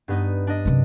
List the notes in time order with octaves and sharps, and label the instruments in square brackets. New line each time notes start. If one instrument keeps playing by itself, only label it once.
[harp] G2 B3 D#4
D4 D#5
[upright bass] F#2 C3